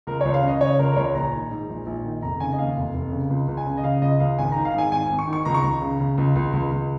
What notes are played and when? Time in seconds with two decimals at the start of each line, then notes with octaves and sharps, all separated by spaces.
0.07 C#2 A#4
0.21 C#5
0.25 C#2
0.34 F5
0.42 C#3
0.47 D#5
0.61 C#3 C#5
0.79 C#2 A#4
0.92 A#4
0.96 C#2 C#5
1.15 A#1 A#5
1.33 D#3
1.51 G#2
1.69 A#1
1.86 A#1
2.04 D#3
2.22 F1 A#5
2.40 C#3 G#5
2.52 D#5
2.58 D#2 F5
2.76 F1
2.94 F1
3.12 C#3
3.30 C#2
3.48 C#2
3.57 G#5
3.66 C#3
3.77 D#5
3.84 C#3 F5
4.02 C#2 D#5
4.20 C#2 F5
4.38 G#1 G#5
4.52 D#3 A#5
4.65 F5
4.74 G#2 G#5
4.92 G#1 G#5
5.10 G#1
5.19 C#6
5.28 D#3
5.33 C#6
5.45 C#2 A#5
5.54 C#6
5.63 C#2 A#5
5.82 C#3
6.00 C#3
6.18 C#2
6.36 C#2
6.53 C#2
6.72 C#2